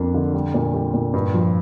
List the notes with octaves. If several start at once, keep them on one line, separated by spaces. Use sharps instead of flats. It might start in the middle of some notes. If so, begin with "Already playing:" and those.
Already playing: F2 A#3 D4
D3
G3
A#2
G3
A#2
G2
F3